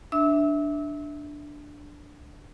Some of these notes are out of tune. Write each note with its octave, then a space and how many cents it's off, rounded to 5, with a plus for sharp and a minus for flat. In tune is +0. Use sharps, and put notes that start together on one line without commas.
D4 +0 E5 -10 E6 -30